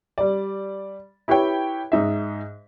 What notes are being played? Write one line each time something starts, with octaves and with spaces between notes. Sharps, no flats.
G3 D5
E4 G4 B4 C#5 G5
G#2 D#4 E5